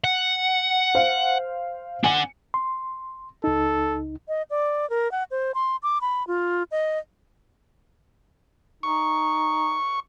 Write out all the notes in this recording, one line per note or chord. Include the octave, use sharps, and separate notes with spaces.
F#5
C5 F5
D4 F#5 G#5 C#7
C6
C#2 D#4 A4
D#5
D5
A#4
F#5
C5
C6
D6
B5
F4
D#5
D#4 C#6